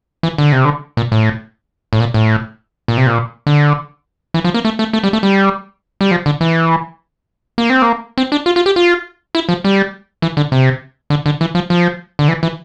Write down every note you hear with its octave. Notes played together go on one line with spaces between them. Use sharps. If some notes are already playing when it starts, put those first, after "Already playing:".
E3
D3
C3
D3
A#2
A2
A2
A#2
A2
A#2
C3
A#2
D3
E3
F3
A#3
A3
A3
A3
G3
A3
G3
G3
F3
D3
E3
A#3
C4
A#3
C4
D4
F4
F4
G4
F4
E4
F3
G3
E3
D3
C3
D3
D3
E3
F3
F3
D3
E3
E3